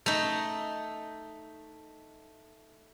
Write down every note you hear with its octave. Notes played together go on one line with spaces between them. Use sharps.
A3 D#4